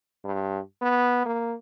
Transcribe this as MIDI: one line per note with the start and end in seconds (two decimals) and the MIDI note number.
0.25 0.59 43
0.81 1.25 59
1.25 1.55 58